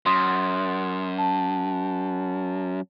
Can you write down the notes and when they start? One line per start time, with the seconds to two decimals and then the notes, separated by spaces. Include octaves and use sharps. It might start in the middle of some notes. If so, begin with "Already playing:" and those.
0.06 F#2 C6 D#6
1.18 A5